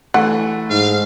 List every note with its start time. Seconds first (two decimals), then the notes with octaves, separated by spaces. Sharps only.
0.14 E3 A3 F#5 G#5
0.70 G#2 F5